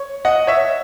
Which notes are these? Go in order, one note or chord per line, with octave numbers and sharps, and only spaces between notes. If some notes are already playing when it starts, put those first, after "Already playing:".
Already playing: C#5
D#5 F#5
C#5 E5